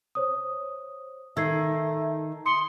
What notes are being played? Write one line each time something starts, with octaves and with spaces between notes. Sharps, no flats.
C5 C#5 D#6
D#3 A3 E6 G#6 C7
C6 D#6 C#7